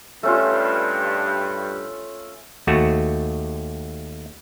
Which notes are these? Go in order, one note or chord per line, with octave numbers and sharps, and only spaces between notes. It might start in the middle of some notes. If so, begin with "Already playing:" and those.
G2 A3 C#4 F4
D#2 A3 F#4